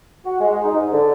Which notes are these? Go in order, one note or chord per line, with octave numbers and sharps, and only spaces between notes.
F#4
G#3
D#4
G#2
D3